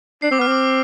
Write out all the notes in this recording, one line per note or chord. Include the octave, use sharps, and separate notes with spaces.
D4 C7
C4 D6
B3 F6
C4 D6